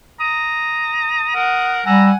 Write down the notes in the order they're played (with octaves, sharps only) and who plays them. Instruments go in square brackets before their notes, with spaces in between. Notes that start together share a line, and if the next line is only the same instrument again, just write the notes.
[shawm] A#5 [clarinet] D#6
[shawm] A#4 [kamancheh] F#5
[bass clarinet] G3 [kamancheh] F#5 G#5 [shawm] A#5 [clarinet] E6